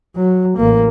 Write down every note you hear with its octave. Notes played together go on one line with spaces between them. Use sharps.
F#3
A1 A#3